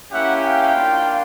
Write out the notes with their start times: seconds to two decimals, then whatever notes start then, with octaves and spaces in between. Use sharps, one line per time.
0.12 A#3 C#4 E4 G4 E5 F#5
0.43 F5 G5
0.74 A#3 D4 F4